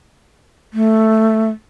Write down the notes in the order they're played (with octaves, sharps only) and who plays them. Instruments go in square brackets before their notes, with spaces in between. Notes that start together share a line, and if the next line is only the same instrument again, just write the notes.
[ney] A3